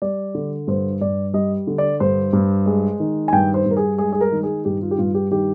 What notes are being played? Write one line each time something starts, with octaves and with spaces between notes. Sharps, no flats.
G3 D5
D3
G2 C5
G2 D5
G3 D#5
D3
D5
G2 C5
G2
G#3
D#3
G#5
G2 G5
C5
G2
A#4
G#4
G#3 G#4
G#4
A#4
D#3
G#4
G2 G4
F4
G4
G2 F4
G4
D#3 G4